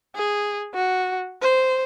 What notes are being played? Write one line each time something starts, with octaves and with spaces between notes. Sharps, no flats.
G#4
F#4
C5